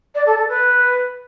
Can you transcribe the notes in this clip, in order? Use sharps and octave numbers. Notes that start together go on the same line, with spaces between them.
D5
A4
A4
B4